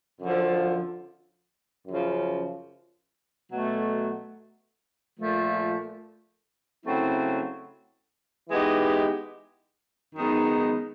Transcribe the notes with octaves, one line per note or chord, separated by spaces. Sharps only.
F#2 D3 F3
F#2 C#3 F3
B2 F#3 A3
A#2 F3 A3
C#3 F#3 A3 C4 E4
E3 G#3 B3 D#4 G4
F#2 D#3 G#3 B3 D#4